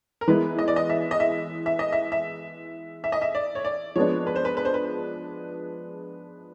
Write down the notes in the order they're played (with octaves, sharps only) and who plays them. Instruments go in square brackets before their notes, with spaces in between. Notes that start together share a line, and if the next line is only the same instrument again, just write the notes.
[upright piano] A#4
[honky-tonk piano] E3 G#3 B3 E4 [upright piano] B4
[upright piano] D#5
D5
D#5
E5
D#5
E5
E5
D#5
E5
E5
E5
D#5
E5
D5
C#5
D5
[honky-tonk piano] F3 G#3 B3 D4 [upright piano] C#5
[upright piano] B4
C5
B4
B4
C5
B4